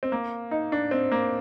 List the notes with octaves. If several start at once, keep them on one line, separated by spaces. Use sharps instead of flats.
C4
A#3
D#4
D4
C4
A#3